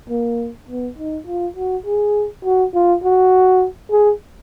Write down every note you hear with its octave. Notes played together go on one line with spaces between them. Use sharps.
A#3
B3
D#4
F4
F#4
G#4
F#4
F4
F#4
G#4